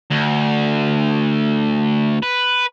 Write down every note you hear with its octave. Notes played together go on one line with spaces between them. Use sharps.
D2
B4